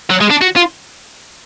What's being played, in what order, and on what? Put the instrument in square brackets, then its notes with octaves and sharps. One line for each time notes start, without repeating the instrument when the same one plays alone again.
[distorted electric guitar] F#3
G#3
D4
F#4
F4